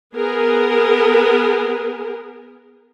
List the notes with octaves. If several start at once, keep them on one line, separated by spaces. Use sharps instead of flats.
B3 G#4 A#4